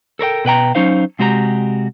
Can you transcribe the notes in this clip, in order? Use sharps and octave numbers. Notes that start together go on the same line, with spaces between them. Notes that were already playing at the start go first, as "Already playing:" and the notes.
A4 A#4 C#5 G5
B2 B4 G5 A#5
F#3 C#4 D#4 C5 F5
C3 G#3 F#4 G4 D5 A#5